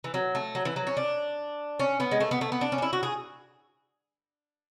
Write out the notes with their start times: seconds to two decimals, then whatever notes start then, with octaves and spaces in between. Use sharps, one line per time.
0.04 E3
0.14 F#3
0.35 A3
0.55 F#3
0.65 E3
0.76 F#3
0.87 C#4
0.97 D4
1.79 C#4
2.00 B3
2.11 G#3
2.20 A3
2.31 B3
2.41 A3
2.52 B3
2.61 D4
2.72 C#4
2.78 D4
2.82 E4
2.93 F#4
3.03 G#4